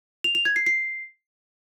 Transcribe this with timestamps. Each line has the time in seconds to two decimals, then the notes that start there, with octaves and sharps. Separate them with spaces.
0.24 F7
0.35 F7
0.45 G#6
0.56 C7
0.66 C7